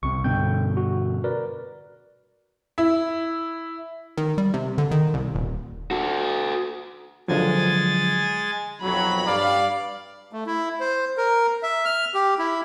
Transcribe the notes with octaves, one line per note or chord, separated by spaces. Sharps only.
C2 C3 C#6
G2 B2 D3 G5 G6
F#4
A#4 B4 D5
E4
D#3
G3
C3
D3
D#3
C2
D#1
F#4 A4
D3 F3 F#3 G#3 G#5 A6
B1 F2 F#3 B5
G2 D5 F5
A3
E4
C5
A#4
E5
F6
G4
E4